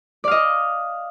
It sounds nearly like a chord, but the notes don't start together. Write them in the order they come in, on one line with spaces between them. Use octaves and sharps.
D5 F5 D#5